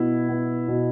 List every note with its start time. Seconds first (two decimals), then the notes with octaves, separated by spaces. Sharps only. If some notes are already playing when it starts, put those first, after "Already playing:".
Already playing: B2 B3 E4
0.29 B3
0.68 B2